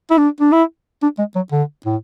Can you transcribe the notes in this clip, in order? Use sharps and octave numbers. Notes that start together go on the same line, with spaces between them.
E4
D4
D4
E4
D4
G#3
F#3
D3
A2